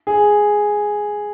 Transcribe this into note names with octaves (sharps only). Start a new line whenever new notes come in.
G#4